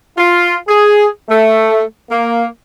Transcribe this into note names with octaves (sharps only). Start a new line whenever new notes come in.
F4
G#4
A3
A#3